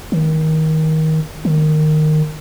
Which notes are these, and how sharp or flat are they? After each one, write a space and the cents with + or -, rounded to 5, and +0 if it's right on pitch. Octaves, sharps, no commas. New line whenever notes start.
D#3 +20
D#3 -15